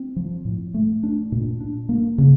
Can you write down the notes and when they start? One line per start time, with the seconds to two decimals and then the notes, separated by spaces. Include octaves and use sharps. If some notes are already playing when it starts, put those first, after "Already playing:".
Already playing: C4
0.16 F3
0.45 A2
0.74 A3
1.03 D4
1.32 A#2
1.60 D4
1.89 A#3
2.18 C#3